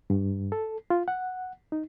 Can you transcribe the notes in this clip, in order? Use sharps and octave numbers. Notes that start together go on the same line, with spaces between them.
G2
A4
F4
F#5
D#4